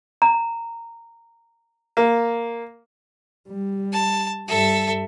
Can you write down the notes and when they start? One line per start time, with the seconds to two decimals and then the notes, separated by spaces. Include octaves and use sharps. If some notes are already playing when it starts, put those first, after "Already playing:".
0.22 A#5
1.97 A#3
3.49 G3
3.92 A5
4.48 G2 G3 A4 E5